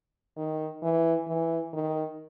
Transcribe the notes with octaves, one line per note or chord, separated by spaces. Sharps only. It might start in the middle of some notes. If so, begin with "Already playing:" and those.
D#3
E3
E3
D#3